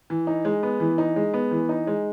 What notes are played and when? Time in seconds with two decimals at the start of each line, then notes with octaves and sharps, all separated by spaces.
0.10 E3
0.27 D#4
0.45 G#3
0.63 B3
0.80 E3
0.98 D#4
1.16 G#3
1.34 B3
1.51 E3
1.69 D#4
1.87 G#3